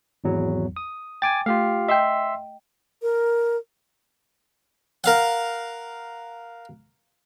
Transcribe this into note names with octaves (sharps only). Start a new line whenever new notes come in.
G#1 E2 F#3
D#6
G5 G#5 D6 A6
A3 F4 G4 F5
D#5 E5 G5 C6 E6
A#4
A#4 F5 F#5